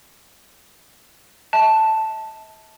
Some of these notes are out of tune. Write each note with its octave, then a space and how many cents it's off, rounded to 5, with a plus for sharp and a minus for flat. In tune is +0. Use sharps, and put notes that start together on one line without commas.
E5 -45 A5 +0